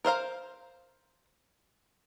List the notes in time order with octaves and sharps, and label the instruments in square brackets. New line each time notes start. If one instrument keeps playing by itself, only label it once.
[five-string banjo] A#4 C5 F5 A#5